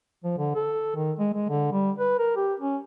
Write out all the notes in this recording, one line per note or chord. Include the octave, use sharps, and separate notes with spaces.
F3
D3
A4
D#3
G#3
G#3
D3
G3
B4
A#4
G4
C#4